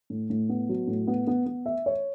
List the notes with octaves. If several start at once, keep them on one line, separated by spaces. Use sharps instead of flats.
A2
A2
B3
F#3
A2
B3
B3
B3
E5
C#5